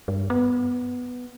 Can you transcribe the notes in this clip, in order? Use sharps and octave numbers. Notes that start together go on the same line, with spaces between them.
G2
B3